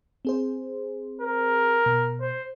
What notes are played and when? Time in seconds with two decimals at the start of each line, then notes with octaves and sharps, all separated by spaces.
0.25 C4 G#4 C5
1.22 A#4
1.86 B2
2.21 C5